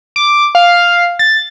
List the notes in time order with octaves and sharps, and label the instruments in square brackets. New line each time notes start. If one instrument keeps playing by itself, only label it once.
[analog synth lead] D6
F5
A6